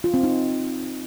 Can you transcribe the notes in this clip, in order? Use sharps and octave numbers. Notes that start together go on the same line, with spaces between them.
F4
C4
D#4